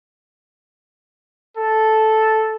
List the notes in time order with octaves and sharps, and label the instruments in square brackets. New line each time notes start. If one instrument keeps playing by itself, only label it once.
[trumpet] A4